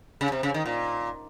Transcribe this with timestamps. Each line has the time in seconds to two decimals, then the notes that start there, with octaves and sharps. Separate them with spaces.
0.21 C#3
0.32 C3
0.43 C#3
0.54 D#3
0.66 A#2